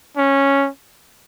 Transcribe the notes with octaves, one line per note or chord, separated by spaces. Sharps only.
C#4